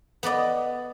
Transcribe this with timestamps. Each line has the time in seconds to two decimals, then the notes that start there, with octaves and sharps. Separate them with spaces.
0.23 B3 B4 D5 D#5